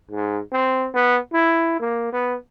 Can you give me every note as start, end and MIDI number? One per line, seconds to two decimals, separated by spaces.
0.11 0.40 44
0.52 0.88 60
0.94 1.18 59
1.33 1.75 64
1.80 2.09 58
2.12 2.35 59